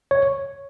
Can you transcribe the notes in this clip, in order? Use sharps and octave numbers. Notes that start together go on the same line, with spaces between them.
C#5